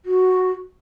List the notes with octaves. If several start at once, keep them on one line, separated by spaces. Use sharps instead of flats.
F#4